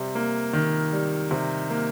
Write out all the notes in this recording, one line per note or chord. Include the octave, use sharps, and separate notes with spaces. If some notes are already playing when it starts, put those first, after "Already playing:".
Already playing: C3 G3
A#3
D#3
G3
C3
A#3